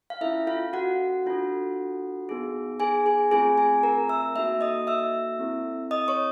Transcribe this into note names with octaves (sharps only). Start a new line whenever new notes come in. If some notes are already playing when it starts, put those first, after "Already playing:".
F5
C#4 E4 F4 A4 E5
F4 F5
F#4 F#5
D4 F4 A4
B3 D#4 G#4
G#4 G#5
G#4 G#5
A3 C4 F4 G#4 G#5
G#4 G#5
A#4 A#5
E5 E6
A#3 D#4 F#4 A4 E5 E6
D#5 D#6
E5 E6
C4 E4 A4
D#5 D#6
C#5 C#6